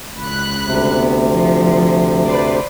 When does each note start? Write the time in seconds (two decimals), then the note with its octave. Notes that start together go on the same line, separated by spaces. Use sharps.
0.18 C#2 B5 F#6
0.66 D2 C3
0.98 B3
1.31 F3
2.27 B4 C5 D5